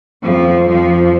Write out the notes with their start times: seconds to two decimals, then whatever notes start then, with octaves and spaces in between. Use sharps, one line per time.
0.22 F2 F3
0.67 F2 F3